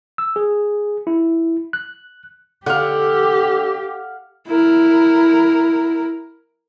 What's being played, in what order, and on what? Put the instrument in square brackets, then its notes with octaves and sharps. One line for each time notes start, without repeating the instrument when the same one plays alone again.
[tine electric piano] E6
G#4
E4
F#6
[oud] D3 [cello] G4 [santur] F5 F#5
[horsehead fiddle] E4 A#4